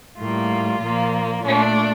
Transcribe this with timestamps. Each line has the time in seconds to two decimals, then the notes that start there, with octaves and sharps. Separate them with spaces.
0.19 A2 G3 A#3 F4
0.81 A#2 F3 A#3
1.43 A#2 A3 D4